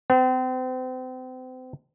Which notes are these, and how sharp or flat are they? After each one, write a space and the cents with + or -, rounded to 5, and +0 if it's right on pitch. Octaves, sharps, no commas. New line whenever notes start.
C4 -35